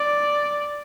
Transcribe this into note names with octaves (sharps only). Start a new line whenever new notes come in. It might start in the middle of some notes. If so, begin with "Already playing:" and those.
Already playing: D5